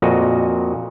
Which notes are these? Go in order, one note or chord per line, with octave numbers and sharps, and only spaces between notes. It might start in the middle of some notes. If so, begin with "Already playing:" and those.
F2 A#2 F#4 D#5